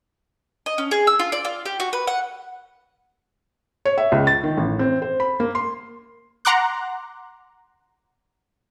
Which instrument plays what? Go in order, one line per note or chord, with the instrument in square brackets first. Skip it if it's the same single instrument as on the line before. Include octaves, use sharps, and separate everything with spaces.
[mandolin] D#5
C#4
G#4
E6
F4
D5
F4
G4
F#4
B4
F#5
[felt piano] C#5
E5
C#2
A6
D#3
A1
C4
C5
B5
A#3
C6
[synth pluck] F#5 A#5 C6 D6 F#6